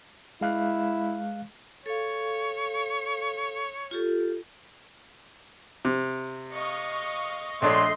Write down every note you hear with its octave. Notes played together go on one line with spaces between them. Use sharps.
G#3 E4 F5 F#6
A4 C#5 F5
F4 G4 A4
C3
D#5 F5 C#6
A#1 A3 D4 C#5 D#5 C6